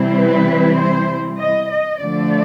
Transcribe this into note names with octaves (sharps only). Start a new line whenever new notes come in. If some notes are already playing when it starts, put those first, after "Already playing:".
Already playing: C3 E3 G3 C4 E4
B4
C5
D#5
D#5
D3 F3 A3 D5